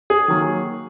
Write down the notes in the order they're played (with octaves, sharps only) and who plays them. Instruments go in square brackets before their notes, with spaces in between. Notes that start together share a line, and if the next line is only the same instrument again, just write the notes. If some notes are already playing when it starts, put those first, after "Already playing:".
[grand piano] G#4
D#3 F#3 A#3